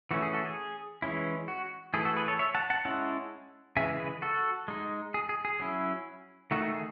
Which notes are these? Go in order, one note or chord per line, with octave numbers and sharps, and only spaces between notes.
E3 A3 C#4 F#4
G#4
F#4 A4
G#4
E3 G#3 C#4 E4
F#4
E3 A3 E4 G#4
F#4 A4
G#4 B4
A4 C#5
C#5 E5
F#5 A5
F#5 A5
G#3 C#4 E4 F#5 A5
C#3 E3 G#3 E5 G#5
G#4 B4
F#4 A4
G#3 D#4
G#4
G#4
G#4
F#3 C#4 E4
D#3 A3 D#4 F#4
G#4